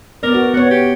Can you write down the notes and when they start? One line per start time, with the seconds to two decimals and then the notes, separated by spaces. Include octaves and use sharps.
0.23 B3 A#4 D5
0.34 F#4
0.54 B3 C#5 F#5
0.70 G4